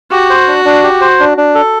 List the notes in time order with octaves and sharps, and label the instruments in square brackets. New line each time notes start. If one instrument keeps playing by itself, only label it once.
[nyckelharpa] F#4 [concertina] G4
[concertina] C5
D4
D4
G4
C5
D4
D4
A4